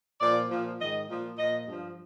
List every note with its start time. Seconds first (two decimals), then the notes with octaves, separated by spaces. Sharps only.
0.20 A#2 F3 D5
0.50 A#2 F3
0.78 G#2 D#3 D#5
1.08 A#2 F3
1.37 A#2 F3 D#5
1.66 G2 F3